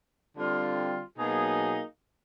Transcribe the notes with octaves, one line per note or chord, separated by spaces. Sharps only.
D3 G3 C4 F4
B2 F#3 A#3 D#4 G#4